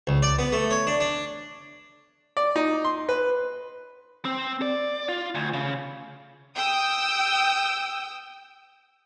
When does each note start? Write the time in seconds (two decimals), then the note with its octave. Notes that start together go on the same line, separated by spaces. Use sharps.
0.07 C#2
0.23 D5
0.39 B3
0.52 A3
0.71 C#5
0.87 D4
1.00 D4
2.37 D5
2.56 D#4
2.85 C6
3.09 B4
4.25 C4
4.62 D5
5.09 F4
5.35 D2
5.54 C#3
6.56 G5 D#6 E6